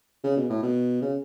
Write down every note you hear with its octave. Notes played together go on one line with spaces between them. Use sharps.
C#3
B2
A2
B2
C#3